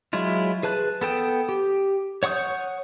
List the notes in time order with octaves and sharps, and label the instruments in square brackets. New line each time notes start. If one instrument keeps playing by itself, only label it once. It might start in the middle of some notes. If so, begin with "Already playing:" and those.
[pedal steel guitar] F#3 G#3 E4 F4
G#4 B4 A5 F#6
B3 A4 G5 D#6
G4
C#5 F#5 C#6 D#6 G6